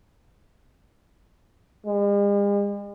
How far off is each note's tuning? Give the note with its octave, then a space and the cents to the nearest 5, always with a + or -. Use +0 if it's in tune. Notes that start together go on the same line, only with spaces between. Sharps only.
G#3 -45